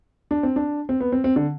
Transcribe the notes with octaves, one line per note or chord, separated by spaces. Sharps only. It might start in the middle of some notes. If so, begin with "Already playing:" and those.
D4
C4
D4
C4
B3
C4
C4
D3